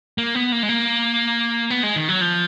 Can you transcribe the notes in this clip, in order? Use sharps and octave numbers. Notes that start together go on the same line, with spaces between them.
A#3
B3
A#3
G#3
A#3
B3
G#3
D#3
F#3
F3